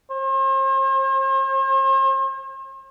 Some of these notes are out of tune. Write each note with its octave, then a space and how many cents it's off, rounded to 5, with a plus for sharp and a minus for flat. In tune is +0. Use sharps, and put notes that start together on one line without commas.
C5 +45